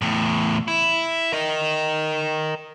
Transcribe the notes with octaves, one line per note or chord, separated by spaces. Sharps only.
E2 A2
E4
A#4 D#5